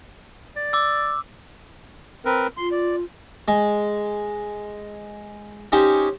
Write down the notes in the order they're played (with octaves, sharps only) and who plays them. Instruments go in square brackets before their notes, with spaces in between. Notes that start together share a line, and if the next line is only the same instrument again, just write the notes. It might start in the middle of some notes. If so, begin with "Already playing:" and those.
[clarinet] D5
[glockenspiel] D6 E6
[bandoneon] C4 A#4 B4
[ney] F4 [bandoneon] C6
[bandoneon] D5
[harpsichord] G#3
C#4 D#4 G4 C5 G#5